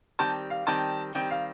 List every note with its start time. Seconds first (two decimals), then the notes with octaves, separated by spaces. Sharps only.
0.19 D#3 G3 C4 G4 A5
0.50 F5
0.67 D#3 G3 C4 G4 A5
1.15 D#3 G3 C4 G4 G5
1.31 F5